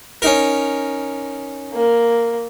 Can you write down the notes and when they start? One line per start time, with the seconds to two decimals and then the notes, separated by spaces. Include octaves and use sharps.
0.22 C#4 D#4 A#4
1.74 A#3